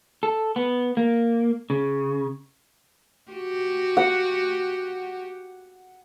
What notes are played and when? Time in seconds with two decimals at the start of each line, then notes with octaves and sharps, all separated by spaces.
0.23 A4
0.56 B3
0.97 A#3
1.70 C#3
3.31 F#4 G4
3.97 F#5